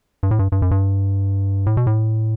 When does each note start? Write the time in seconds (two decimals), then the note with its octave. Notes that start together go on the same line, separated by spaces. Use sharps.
0.23 G2
0.31 A2
0.39 G2
0.52 G2
0.62 F#2
0.71 G2
1.66 A2
1.77 B2
1.87 A2